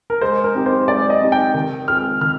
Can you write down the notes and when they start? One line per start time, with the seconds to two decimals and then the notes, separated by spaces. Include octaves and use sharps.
0.10 A#4
0.21 G#3 C5
0.44 A#4
0.55 C4 D#4 G4
0.66 C5
0.88 G#3 D5
1.10 D#5
1.21 C4 D#4 G4
1.32 G5
1.54 D#3
1.88 G#3 C4 F4 G#4 F6
2.21 D#3 F6